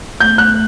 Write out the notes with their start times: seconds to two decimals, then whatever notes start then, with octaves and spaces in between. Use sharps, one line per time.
0.20 A3 G6
0.38 F#6